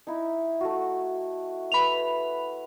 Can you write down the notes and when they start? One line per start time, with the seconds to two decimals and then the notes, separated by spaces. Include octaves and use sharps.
0.07 D#4 E4
0.61 A3 F#4
1.72 B4 E5 B5 F7